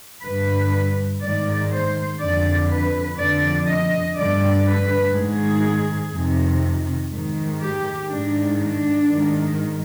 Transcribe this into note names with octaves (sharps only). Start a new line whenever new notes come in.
G2 D3 B4
G#2 D#3 D5
C5
F2 D3 D5
B4
F2 D3 D5
D#5
G2 D3 D5
B4
G#2 D#3 G#4
F2 C3 D#3
G#2 D#3
G4
G#2 D#3 D4
D4
G#2 D#3